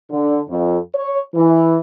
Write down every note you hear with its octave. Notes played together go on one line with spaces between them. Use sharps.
D3
F2
C#5
E3